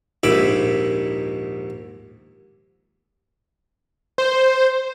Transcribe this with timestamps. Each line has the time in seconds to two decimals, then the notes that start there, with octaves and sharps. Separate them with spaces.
0.23 A#1 D#2 G#2 E5 B5 D6
4.18 C5